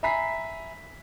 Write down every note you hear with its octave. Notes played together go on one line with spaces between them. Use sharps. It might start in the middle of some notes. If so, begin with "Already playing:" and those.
E5 G#5 A#5 B5 B6 C7